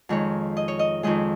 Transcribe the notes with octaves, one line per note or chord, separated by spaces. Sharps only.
F2 D#3 G#3 C#5
D#5
C#5
D#5
F2 D#3 G#3 D#5